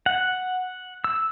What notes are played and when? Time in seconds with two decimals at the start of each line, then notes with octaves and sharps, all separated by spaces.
0.06 F#5
1.04 E6